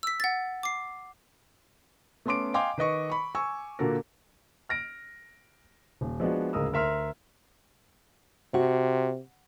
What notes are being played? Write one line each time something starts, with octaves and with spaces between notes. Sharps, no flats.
E6 B6
F#5 A6
D6 C7
A3 B3 C#4 C6 D6 D7
D#5 F5 G5 G#5 C6 D6
D#3 B4 D#5 C#6
B5 C#6
G#5 C#6 E6
A#2 D3 A#3 F#4 A4 A#4
F6 A#6 D7
D#1
F3 G#3 B3 D4 F#4
D1 C#2 G#3 A#4 D#6 E6
D2 A#4 E5 C6 F6
C3 F#4